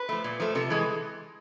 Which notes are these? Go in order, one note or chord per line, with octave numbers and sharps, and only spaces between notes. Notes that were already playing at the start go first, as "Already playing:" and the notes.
Already playing: B4
F3 A3
A#2
F3 A3
C3 A4
E3 G#3